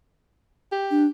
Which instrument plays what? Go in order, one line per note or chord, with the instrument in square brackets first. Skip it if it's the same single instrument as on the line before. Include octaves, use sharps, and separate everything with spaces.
[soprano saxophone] G4
[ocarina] D4